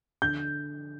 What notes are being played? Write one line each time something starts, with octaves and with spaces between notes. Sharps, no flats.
D3 G6